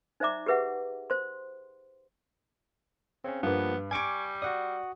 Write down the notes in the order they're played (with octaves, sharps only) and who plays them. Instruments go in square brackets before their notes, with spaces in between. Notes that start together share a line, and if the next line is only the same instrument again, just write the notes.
[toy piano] D#4 C5 D5 E5 A#5 D6
G4 G#4 B4 E5 F#5
C5 C6
[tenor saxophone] C#3 [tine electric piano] C4 C#4
[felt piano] G2 B4 [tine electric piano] F3 A#3 [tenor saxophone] B3
[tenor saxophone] G3 [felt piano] G#5 D7 [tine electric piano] C#6 D6 G#6
[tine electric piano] F#4 F#5 D#6 [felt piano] D5